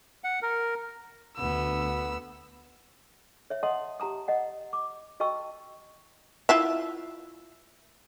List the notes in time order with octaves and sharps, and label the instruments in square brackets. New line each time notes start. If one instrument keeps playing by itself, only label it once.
[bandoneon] F#5
A#4
[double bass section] D2 [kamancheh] B3 E6
[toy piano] C#5 E5
D#5 F#5 A5 C6 D#6
G4 A5 A#5 D#6
D#5 F#5
D6
F#4 D#5 G5 A5 C#6 E6
[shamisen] E4 F4 E5